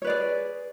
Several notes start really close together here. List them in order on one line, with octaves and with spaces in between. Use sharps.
C#5 B4 D5 G#4